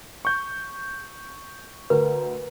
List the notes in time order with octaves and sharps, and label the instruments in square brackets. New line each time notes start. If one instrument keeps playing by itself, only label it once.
[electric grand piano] C#6 G6
[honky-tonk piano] D2 [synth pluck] A#4 [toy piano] B4